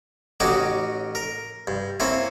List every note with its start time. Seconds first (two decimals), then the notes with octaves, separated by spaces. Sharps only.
0.40 A1 C#4 D#4 F#4 G4 D6
1.15 A#4
1.67 G2
2.00 A#3 C4 C#4 E4